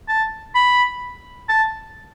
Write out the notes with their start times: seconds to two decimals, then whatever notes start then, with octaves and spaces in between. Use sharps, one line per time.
0.08 A5
0.55 B5
1.49 A5